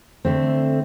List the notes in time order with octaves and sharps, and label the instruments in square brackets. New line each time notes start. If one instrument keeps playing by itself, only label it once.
[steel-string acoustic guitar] D3 A3 C4